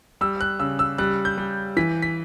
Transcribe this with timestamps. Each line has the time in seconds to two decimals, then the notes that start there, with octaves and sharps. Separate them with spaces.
0.21 G3 E6
0.41 F#6
0.60 C#3 E6
0.79 E6
0.98 G3 F#6
1.25 G6
1.38 G3
1.77 E3 B6
2.02 B6